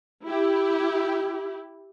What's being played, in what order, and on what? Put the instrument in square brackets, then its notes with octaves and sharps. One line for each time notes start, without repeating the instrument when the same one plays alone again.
[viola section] E4 G4